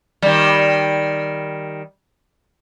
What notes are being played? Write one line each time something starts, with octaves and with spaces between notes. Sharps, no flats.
D#3 G3